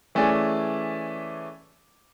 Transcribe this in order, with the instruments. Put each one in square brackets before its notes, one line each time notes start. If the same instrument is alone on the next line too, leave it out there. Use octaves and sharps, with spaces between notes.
[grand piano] E3 A3 C#4 G#4 D5